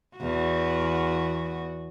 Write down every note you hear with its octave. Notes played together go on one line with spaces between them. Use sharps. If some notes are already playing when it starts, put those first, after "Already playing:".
E2 F#4